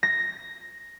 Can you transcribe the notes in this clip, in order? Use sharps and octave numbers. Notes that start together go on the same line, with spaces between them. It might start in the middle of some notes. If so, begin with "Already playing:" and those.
A#6